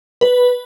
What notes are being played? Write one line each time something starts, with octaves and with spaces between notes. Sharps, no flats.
B4